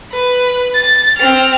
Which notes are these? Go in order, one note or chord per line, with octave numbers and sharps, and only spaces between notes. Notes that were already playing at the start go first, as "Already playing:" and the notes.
B4
A6
C4 F6